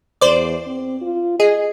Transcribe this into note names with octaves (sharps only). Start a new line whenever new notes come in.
E2 C5 D5
C4
F4
G#4 D#5